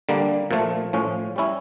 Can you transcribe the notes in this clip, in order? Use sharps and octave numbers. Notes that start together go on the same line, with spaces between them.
D3 G3 A#3
A#2 F3 A3
A2 F3 C#4
G3 C#4 E4